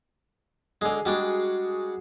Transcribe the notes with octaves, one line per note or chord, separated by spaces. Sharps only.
D3 G#3 G#4
G3 G#3 D4 F#4